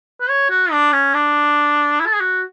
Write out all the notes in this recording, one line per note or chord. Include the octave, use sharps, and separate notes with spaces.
B4
C#5
F#4
D4
C#4
D4
E4
A4
G#4
F#4